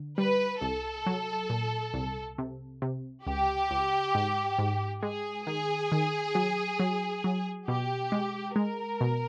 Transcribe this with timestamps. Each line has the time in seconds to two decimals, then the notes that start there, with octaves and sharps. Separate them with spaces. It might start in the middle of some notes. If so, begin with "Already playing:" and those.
Already playing: D3
0.18 G3 B4
0.61 C2 A4
1.06 F#3
1.50 A#2
1.94 C2
2.38 C3
2.82 C3
3.26 C#2 G4
3.71 C#2
4.15 G#2
4.59 G#2
5.03 G#3 G#4
5.47 D#3 G#4
5.92 D#3
6.35 F#3
6.80 F#3
7.24 F#3
7.68 B2 G4
8.12 G#3
8.56 G#3 A#4
9.01 B2